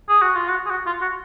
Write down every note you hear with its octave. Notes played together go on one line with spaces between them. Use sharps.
G#4
F#4
F4
F#4
G#4
F#4
F4
F#4